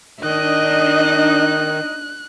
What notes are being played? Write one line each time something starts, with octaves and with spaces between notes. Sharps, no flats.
D#3 D4 D#4 D#5 F#6